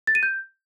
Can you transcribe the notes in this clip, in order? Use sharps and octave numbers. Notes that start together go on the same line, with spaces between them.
A6
D#7
G6